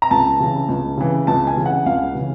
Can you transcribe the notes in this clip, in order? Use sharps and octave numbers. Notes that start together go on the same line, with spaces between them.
A#5
C#2 A5
C#3 E3
C#2
C#3 E3
C#2 A5
G#5
C#3 E3
F#5
C#2 F5
C#3 E3